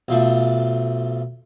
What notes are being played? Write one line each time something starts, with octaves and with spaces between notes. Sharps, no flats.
B1 F3 A3